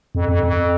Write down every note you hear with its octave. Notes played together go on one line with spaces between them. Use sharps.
F2
F2
F2